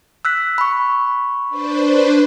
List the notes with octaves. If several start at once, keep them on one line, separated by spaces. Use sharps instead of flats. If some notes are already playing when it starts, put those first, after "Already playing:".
E6 F#6 B6
B5 C#6
D4 B4 C5